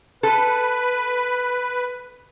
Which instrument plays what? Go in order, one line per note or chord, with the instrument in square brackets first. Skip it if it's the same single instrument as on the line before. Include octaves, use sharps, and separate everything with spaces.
[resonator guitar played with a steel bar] A4 [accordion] B4